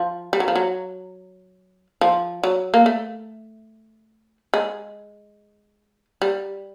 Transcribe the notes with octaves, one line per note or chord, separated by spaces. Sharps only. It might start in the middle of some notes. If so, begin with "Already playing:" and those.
Already playing: F3
G3
F#3
F3
F#3
F3
F#3
A#3
A3
G#3
G3